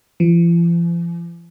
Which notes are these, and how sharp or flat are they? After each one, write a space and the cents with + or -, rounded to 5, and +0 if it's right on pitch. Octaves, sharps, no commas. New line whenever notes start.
F3 -45